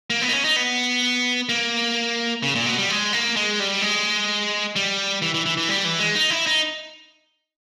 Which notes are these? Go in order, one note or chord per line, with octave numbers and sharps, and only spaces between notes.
A#3
B3
D#4
C#4
D#4
B3
A#3
C#3
A#2
B2
G3
G#3
A#3
G#3
G3
G#3
G3
E3
E3
E3
E3
G3
E3
G#3
D#4
E4
D#4